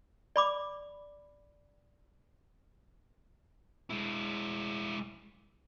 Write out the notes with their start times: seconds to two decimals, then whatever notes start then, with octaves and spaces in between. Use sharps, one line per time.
0.36 D5 B5 D6
3.90 G#3 E4